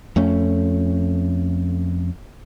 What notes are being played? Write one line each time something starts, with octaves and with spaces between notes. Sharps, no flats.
F2 A3 C#4